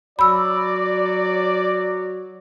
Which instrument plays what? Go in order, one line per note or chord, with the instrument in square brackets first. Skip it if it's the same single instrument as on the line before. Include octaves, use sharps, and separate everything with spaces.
[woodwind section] F#3 F#4 [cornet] D5 [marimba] B5 E6